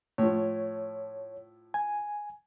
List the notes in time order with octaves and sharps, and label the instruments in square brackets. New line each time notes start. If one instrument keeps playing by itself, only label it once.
[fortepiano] A2 F3 [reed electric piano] C#5
[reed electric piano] G#5